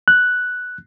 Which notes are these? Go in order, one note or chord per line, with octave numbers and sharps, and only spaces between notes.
F#6